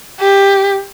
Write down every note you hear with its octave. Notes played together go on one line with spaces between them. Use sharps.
G4